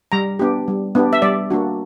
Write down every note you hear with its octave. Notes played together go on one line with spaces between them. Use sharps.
G3 A#5
B3 D4 G4
G3
B3 D4 G4
E5
G3 D5
A#3 D4 F#4